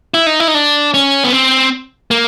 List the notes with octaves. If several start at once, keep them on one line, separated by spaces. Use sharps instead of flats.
E4
D#4
E4
D#4
D4
C#4
B3
C4
A#3